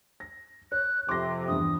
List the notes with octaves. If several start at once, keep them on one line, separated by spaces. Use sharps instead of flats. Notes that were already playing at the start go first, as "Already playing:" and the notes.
A#6
C#5 F#6
F2 C3 C6 D6 A#6
E2 G2 D#6